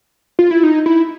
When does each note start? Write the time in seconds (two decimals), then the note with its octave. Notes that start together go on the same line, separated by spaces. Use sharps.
0.39 F4
0.51 E4
0.63 D#4
0.86 E4